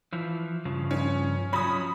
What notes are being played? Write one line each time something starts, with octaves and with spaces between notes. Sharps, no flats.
E3 F3
G2 C#3 F3
C#4
F3 F#3 C#4 B5 D#6